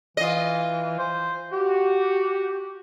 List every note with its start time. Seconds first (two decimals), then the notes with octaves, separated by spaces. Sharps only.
0.17 E3 F4 D#5
0.98 C5
1.52 F#4 G4